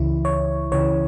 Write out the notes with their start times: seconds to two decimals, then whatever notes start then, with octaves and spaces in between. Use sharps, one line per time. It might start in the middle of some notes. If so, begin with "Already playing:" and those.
Already playing: C#2 C#3 E3 E4
0.25 C#5
0.72 C#2 C#3 E3 C#5